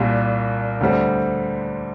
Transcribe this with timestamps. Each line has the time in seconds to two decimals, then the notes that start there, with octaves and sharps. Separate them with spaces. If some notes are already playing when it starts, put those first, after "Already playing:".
Already playing: C2 A#2 G3 A#3
0.81 D2 C3 G3 C4